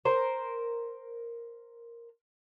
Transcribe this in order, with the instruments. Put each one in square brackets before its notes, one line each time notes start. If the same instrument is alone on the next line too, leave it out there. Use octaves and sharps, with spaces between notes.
[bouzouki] A#4 C5